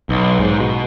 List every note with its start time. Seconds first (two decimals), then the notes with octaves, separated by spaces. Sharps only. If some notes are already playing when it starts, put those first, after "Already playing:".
0.09 B1
0.40 G#2
0.60 B2